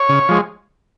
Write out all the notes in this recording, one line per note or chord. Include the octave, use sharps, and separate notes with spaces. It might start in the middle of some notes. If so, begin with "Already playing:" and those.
Already playing: C#5
C#3
F3 G#3